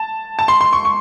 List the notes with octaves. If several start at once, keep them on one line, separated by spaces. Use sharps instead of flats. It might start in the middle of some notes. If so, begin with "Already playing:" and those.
Already playing: A5
A5
C6
C6
C#6
C#6